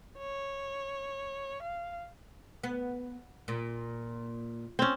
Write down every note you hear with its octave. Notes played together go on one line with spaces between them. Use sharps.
C#5
F5
B3
A#2
C4 C#4